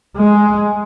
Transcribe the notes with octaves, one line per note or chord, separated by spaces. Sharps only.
G#3